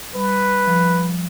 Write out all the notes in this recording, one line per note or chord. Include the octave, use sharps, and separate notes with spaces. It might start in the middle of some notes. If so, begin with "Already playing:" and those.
G3 B4
F3